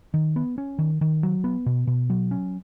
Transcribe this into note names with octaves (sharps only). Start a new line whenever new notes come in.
D#3
B3
C#4
D#3
D#3
F#3
B3
B2
B2
F#3
C#4